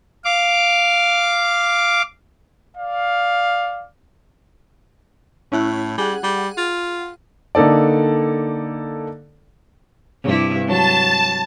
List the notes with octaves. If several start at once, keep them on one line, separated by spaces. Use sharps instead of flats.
F5 D6
D5 F5
A2 C#4 E4 F#6
G3 G#4 F#5
G3
F4
D3 A#3 D#4 A4 D5
G2 C3 E4
F#3 A5